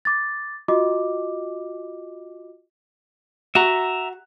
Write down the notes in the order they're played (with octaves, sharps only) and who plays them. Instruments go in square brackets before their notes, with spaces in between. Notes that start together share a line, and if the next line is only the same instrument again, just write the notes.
[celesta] D6 A6
F4 F#4 D#5 D6
[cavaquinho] F#4 [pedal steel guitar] E5 A#5